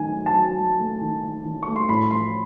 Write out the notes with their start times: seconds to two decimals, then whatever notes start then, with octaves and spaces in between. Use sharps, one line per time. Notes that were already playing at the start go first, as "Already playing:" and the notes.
Already playing: D#3 F#3 A3 G#5
0.16 F#3
0.26 A5
0.36 F#3
0.58 F#3
0.80 A3
1.01 D#3
1.24 D#3
1.45 D#3
1.63 A3 C#6
1.76 C6
1.89 A2 B5
2.11 F3 C6